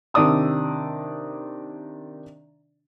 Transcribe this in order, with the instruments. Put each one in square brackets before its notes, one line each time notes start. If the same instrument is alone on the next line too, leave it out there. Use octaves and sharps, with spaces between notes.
[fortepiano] C3 D#3 D4 D5 D#6 E6